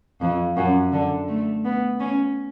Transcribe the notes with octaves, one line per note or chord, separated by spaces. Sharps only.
F2
F#2
D3
A3
B3
C#4